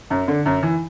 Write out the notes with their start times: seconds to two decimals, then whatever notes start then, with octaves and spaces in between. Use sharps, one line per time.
0.10 F#2
0.28 D3
0.46 F#2
0.63 E3